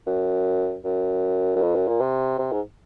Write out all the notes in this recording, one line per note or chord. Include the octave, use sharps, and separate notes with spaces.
F#2
F#2
F#2
F2
F#2
A#2
C3
C3
G#2